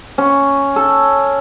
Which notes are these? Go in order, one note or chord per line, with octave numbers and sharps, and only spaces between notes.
C#4
A4